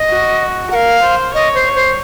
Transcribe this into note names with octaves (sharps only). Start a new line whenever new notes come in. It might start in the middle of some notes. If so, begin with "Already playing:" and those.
Already playing: D#5
F#4
A#4 F5 F#5
C5
C#5 D#5
C5
C#5
C5